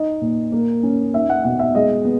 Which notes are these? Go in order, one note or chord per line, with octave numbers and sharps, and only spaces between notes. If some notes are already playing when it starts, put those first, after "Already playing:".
Already playing: D#4 D#5
A#2
A#3
C#4
D#4 E5
F#5
B2 F#5
E5
G#3 D#5
B3